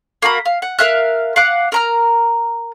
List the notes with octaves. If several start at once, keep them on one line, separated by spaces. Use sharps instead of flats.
A#3 F#4 A#5 B5
F5
F#5
A#4 E5 F5 F#6
F5 F#5 D6 F#6
A#4 A#5 F6